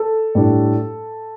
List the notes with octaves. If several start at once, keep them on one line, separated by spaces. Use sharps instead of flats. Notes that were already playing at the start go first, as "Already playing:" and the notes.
Already playing: A4
A2 G3 D4